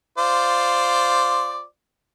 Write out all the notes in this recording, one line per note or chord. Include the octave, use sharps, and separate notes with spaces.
F4 C5 D5